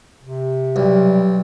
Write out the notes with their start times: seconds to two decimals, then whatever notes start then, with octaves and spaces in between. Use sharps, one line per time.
0.22 C3
0.76 B1 G3